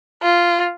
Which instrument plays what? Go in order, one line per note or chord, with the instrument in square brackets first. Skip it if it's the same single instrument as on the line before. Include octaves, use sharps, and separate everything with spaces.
[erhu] F4